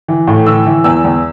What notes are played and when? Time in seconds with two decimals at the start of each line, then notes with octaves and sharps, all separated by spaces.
0.08 E3
0.28 A2
0.46 E3 E6
0.66 E3
0.84 E2 E6
1.04 E2